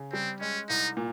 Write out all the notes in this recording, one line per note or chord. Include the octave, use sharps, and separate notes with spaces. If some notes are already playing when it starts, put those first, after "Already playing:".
Already playing: C#3
G3 C4
G#3 C#4
C2 D#4
A#2